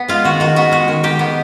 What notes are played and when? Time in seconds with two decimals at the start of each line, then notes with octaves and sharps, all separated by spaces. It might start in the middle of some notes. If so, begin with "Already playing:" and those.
Already playing: B3
0.08 G#3 F4
0.24 D#3 F#4
0.40 D#3 F#4
0.56 B3 F#4
0.72 G#3 F#4
0.88 D#3
1.03 D#3 G4
1.19 B3